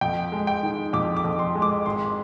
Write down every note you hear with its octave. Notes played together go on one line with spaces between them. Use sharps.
F2 G5
G#3
G5
D#3
F2 D6
D6
F2
C6
G#3
D6
G#1 C6